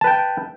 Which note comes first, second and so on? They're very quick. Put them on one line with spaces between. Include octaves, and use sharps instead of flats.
A5 B4 G5